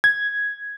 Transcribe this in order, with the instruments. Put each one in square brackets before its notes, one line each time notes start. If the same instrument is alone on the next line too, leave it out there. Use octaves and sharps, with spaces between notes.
[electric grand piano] G#6